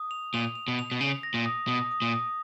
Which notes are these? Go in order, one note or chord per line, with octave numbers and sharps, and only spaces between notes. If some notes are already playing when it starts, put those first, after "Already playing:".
Already playing: D#6
F7
A#2 F7
F7
B2
F7
B2
C#3 F7
A#6
A#2
D#6
B2 D#6
D#6
A#2
D#6